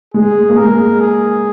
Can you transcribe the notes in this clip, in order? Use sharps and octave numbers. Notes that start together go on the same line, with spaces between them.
G#3 G#4
A#3
G#3 A#4
G#4